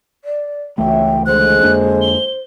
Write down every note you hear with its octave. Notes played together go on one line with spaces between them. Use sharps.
D5
C#2 E3 A3 F#4 C#5 E5 G5
D3 G#3 C5 F#6
F2 A#3 D4
G7